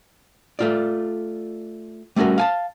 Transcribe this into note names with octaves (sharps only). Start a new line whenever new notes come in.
A3 F4 D5
G3 A3 C#4 F#4 A#4
F5 G#5 A5